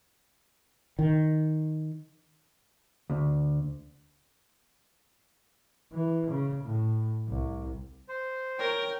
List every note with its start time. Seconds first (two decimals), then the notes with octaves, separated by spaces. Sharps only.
0.99 D#3
3.10 D2
5.92 E3
6.31 C#3
6.64 A2
7.28 C2
8.09 C5
8.59 A#4 C#5 G5 C#6